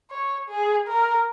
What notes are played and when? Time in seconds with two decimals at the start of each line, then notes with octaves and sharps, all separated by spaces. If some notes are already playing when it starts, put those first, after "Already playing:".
0.11 C#5
0.49 G#4
0.87 A#4